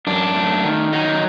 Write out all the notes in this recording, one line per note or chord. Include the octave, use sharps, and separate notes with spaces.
F#2 D4
A3
D#3
F#3 D#4